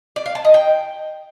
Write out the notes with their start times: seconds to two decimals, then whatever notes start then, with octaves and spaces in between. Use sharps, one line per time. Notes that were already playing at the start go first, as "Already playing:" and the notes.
0.16 D5
0.26 F5
0.35 A5
0.45 D#5
0.54 G5